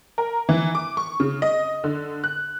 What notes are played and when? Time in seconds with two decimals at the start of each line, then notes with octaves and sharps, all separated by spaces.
0.18 A#4
0.49 E3
0.75 D6
0.97 C#6
1.20 C#3
1.42 D#5
1.84 D3
2.24 F#6